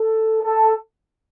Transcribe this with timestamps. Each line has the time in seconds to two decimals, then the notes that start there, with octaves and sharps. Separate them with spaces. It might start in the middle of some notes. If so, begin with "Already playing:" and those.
Already playing: A4
0.42 A4